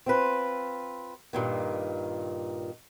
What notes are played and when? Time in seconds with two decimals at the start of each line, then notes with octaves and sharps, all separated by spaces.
0.06 C4 F4 B4
1.33 G2 A#2 D#3